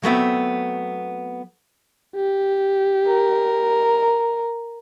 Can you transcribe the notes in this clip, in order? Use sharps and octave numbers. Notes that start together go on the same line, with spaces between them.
F#3 A3 B3 C4
G4
A#4